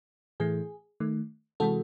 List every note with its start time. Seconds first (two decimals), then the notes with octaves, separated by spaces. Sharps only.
0.40 A2 E3 A3 G#4
1.00 D#3 A3
1.60 C3 E3 G#3 F#4 A4